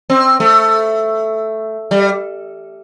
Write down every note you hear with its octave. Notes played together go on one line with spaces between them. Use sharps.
C4
A3
G3